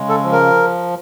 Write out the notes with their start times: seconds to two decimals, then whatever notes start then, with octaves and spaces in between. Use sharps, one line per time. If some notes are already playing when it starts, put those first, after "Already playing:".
Already playing: C#3 G#3
0.09 A4
0.24 F3
0.32 A#4